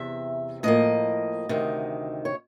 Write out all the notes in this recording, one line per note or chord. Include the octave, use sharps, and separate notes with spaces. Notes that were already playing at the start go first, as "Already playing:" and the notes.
Already playing: E2 C3 E5
A2 F3 A#3 D#5
D2 C3 D#3
C#5